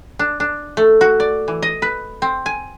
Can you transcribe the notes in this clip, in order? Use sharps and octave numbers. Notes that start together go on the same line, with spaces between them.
D4
D4
A3
F#4
D5
E3
D#5
B4
C4
G#5